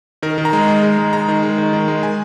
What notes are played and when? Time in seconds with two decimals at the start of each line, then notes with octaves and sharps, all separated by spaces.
0.22 D#3 A#4
0.38 D#3
0.45 A#5
0.53 G#3
0.68 G#3
0.83 G#3
0.98 G#3
1.13 G#3 A#5
1.28 D#3
1.43 G#3
1.58 D#3
1.73 D#3
1.88 G#3
2.03 G#3 G#5